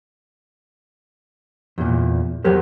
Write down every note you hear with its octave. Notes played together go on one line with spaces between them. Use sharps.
E2 A#2
E2 F#3 G4 A#4 C5